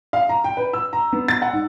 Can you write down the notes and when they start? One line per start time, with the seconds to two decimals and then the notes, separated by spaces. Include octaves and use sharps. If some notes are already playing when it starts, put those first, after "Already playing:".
0.13 F5
0.29 A#5
0.44 G5
0.57 B4
0.73 E6
0.93 A#5
1.13 B3
1.28 A6
1.42 F#5
1.53 G#2